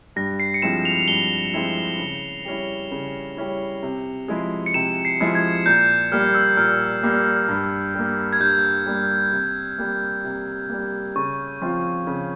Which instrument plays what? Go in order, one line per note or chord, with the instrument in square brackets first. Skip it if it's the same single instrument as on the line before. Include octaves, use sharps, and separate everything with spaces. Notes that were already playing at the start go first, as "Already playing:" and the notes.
[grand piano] G2 [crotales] A#6
[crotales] C7
C#7
[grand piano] F3 G#3 C4 E4 [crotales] E7
[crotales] F7
[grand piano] G2 [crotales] G7
[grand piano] F3 G#3 C4 E4
C#3
G3 C#4 E4
C#3
G3 C#4 E4
C3
F3 G#3 E4 G#4
[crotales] C#7
[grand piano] C3 [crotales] E7
[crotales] C7
[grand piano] F3 G#3 E4 G#4
[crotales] G#6
[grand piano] A#2 [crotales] G6
[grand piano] G3 A#3 [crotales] F6
[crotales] E6
[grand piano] A#2 [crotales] F6
[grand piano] G3 A#3
G2
G3 A#3
[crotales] G#6
[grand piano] G2 [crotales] G6
[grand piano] G3 A#3
C3
G3 A#3
C3
G3 A#3
[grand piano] C#3 [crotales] C#6
[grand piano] F3 C4 F4
C#3